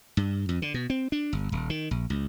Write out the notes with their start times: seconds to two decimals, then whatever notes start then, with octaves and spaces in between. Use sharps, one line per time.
0.17 G2
0.49 F2
0.62 D3
0.74 B2
0.90 C4
1.12 D4
1.33 G1
1.52 D#1
1.70 D#3
1.91 A#1
2.10 C#2